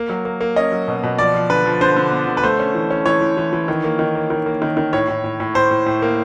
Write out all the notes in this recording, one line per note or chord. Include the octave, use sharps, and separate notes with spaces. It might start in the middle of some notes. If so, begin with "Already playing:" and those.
Already playing: A#3
F#3
A#3
A#3
C#4 D#5
F#3
B2
B2
F3 D5
F3
D3 B4
F3
D3 C5
D3
B3
D3
B4
A3 C5
C#4
E3
C#4
E3 C#5
E3
E3
E3
D#3
A#3
D#3
A#3
D#3
A#3
D#3
D#3
A2 C#5
A2
A2
A2
A2 C5
A2
A2
A#3